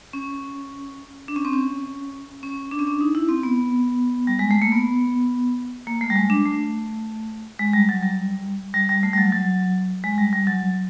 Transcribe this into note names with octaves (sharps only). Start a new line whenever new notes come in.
C#4
D4
C#4
C4
C#4
C#4
D4
C#4
D4
D#4
E4
C4
B3
G3
G#3
A3
A#3
B3
A#3
A3
G3
G#3
D4
A3
G#3
G3
F#3
G3
G3
G3
A3
G3
F#3
F#3
G#3
G3
G3
F#3